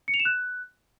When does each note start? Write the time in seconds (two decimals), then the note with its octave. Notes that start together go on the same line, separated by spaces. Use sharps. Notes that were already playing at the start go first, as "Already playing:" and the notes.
0.08 C#7
0.14 F7
0.20 E7
0.25 F#6